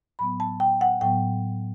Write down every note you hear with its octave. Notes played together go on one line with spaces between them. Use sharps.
A2 F#3 B3 B5
A5
G5
F#5
A2 F#3 B3 G5